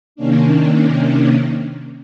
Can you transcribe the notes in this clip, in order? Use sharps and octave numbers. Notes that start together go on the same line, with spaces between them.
C3 D#3 A#3 C#4 D4